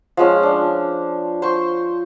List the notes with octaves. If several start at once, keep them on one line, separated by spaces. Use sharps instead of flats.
F3 G#3 C#4
D4
C5 C6 C#6